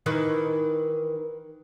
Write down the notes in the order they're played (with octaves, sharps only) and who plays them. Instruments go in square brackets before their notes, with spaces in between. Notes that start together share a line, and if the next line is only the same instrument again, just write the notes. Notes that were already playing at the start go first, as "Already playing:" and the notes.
[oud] D#3 E3 B4